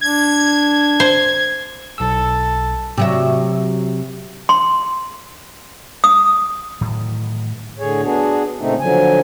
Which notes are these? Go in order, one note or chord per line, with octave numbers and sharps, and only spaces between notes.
D4 G#6
C5
B1 A4 E6
C3 F#3 E5
C6
D#6
A2 D#3 E3 F#3
A2 D3 G#4 C#5
B3 D4 F#4 G#4
A#2 C#3 A3 C4 D#4
D3 F3 F#3 G#5